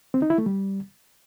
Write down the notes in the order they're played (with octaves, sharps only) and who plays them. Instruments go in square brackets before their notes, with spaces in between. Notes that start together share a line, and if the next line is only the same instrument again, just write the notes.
[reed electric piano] C4
D#4
E4
A3
G3